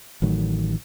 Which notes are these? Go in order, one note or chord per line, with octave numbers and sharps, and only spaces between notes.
A1 A2 D#3 F#3